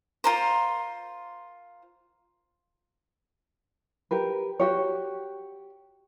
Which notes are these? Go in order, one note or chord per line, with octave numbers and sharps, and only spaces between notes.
F4 A#4 C5
G4 A#4 B4
F#4 G4 C#5